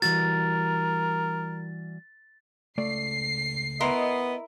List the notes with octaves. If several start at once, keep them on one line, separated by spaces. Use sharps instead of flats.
E3 G3 F#4 A#4 A6
C#2 A3 D5 C7
B3 E4 A#4 D#5 C6